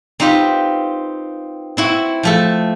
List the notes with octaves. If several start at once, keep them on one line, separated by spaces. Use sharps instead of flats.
C4 D#4 F4 G4 B4
C4 E4 F#4
F3 A3 A4